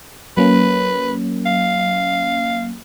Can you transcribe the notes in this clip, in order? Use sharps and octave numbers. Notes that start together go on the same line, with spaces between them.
F#3 A#3 C#4 B4
F5